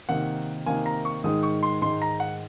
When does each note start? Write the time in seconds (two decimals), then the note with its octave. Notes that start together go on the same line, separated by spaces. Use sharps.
0.09 C3 D#3 A#3 F#5
0.66 C3 D#3 A#3 G#5
0.86 A#5
1.05 C#6
1.24 G#2 D#3 G#3 D#4 D#6
1.43 C#6
1.63 C6
1.82 G#2 D#3 G#3 D#4 C6
2.02 A#5
2.20 F#5